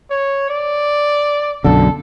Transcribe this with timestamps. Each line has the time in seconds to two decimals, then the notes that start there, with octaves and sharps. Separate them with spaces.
0.10 C#5
0.50 D5
1.64 B1 F#2 D3 A4